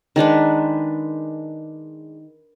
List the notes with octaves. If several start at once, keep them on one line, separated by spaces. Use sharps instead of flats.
D#3 G#3 D4 B4